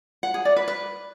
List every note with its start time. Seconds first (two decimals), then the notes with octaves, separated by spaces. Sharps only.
0.23 F#5
0.34 G#4
0.45 D5
0.56 B4
0.68 B4